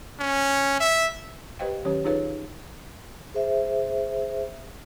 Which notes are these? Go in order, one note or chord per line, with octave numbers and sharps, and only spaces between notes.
C#4
E5
G4 B4 C5 D#5 F5 G5
D#3 F#3 C#4 G4 C#5
D#4 F4 G#4 B4 C#5 F5
G#4 C5 E5